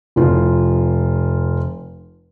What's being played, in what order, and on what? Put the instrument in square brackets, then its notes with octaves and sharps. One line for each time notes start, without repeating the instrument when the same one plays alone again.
[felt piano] F1 F4